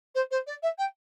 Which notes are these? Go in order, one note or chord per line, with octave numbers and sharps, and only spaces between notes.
C5
C5
D5
E5
G5